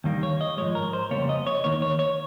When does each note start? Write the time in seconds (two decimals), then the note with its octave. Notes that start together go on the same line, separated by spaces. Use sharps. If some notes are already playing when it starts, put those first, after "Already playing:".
0.04 D#2 D#3 G3 A#3
0.23 C#5
0.41 D#5
0.57 G#2 F3 G#3 C#5
0.75 A#4
0.93 C5
1.11 F2 C#3 G3 A#3 C#5
1.29 D#5
1.47 C#5
1.64 D#2 D#3 A#3 C#5
1.82 C#5
1.99 C#5